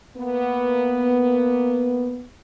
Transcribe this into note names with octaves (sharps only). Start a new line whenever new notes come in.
A#3 B3